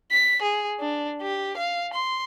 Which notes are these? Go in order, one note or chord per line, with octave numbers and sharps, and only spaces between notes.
B6
G#4
D4
G4
F5
C6